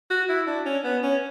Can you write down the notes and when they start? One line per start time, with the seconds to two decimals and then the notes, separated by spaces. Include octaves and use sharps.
0.10 F#4
0.29 E4
0.47 D4
0.66 C#4
0.84 B3
1.03 C#4